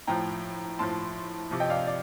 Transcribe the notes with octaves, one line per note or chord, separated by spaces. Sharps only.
A2 F3 G5 A#5
A2 F3 A5 C6
C3 F3
D#5 G5
D5 F5
D5